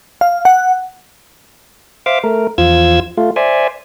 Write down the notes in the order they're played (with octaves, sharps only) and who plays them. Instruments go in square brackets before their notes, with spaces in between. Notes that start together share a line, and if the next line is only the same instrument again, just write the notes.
[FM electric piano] F5
F#5
[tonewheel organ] C5 E5 F5 D6
A3 A#4
E2 F3 F4 E6 G#6
A3 F4
C5 D5 E5 G#5